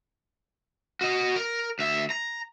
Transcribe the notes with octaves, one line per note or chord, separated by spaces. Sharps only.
F#4 D#5
A#4
D2 E5
A#5